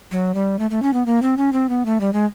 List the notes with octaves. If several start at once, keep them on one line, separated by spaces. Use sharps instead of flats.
F#3
G3
A3
A3
C#4
B3
A#3
C4
C#4
C4
B3
A3
G3
G#3